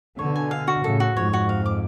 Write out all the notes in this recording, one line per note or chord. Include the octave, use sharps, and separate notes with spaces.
B2 D3 C#5
G#5
F5
F#4
A2 C#3 A4
F#4
F2 G#2 C#5
F#4
F5
D6